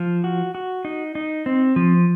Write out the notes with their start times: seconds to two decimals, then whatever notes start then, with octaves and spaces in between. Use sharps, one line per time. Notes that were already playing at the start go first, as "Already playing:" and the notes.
Already playing: F3
0.24 F#4
0.55 F#4
0.85 D#4
1.15 D#4
1.46 C4
1.76 F3